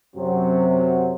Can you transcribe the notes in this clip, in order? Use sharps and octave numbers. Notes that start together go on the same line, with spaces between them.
F#2 C3 F#3